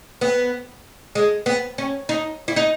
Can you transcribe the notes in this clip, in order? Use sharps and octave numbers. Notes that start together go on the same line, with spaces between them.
B3
G#3
B3
C#4
D#4
E4
D#4